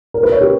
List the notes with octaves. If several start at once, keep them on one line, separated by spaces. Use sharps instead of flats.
A#4
B4
C#5
G4